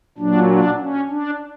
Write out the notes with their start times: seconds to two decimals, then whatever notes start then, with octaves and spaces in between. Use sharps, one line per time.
0.18 A#2 F#3 D4
0.49 D4
0.79 C#4
1.09 D4